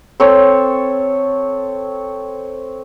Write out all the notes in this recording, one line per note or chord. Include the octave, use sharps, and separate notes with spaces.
C4 A4 C#5